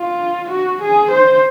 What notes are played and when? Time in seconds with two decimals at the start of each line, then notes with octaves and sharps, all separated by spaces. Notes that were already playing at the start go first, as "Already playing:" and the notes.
Already playing: F4
0.51 F#4
0.82 G#4
1.12 C5